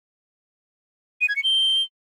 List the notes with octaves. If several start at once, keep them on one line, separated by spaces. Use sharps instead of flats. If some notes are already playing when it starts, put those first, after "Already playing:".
D#7
G#6
C#7
G7